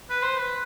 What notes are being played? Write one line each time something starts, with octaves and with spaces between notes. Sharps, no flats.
B4
C5
B4